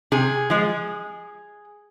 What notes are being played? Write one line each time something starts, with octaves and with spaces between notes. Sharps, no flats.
C3 G#4
F3 G#3